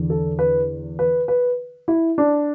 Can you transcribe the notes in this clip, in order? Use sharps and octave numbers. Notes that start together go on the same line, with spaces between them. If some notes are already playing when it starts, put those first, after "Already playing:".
Already playing: E2 D3
A4
B4
B4
B4
E4
D4